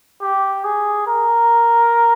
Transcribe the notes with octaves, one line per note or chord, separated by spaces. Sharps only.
G4
G#4
A#4